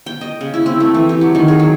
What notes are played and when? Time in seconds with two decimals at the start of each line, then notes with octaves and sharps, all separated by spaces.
0.06 G5
0.21 D#5
0.41 C#3
0.54 E4
0.66 C4
0.80 A3
0.94 E3
1.09 G4
1.21 F#3
1.35 D#3
1.48 G#4
1.60 F#3